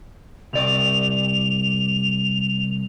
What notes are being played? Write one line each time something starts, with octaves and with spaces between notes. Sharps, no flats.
C2 D5 F7